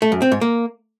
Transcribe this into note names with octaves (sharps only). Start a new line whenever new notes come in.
A3
F#2
C4
G#2
A#3